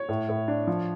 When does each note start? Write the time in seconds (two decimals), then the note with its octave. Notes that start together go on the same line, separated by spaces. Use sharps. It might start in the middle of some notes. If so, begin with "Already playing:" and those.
Already playing: C#5
0.09 A2
0.29 A2
0.48 D4
0.67 F3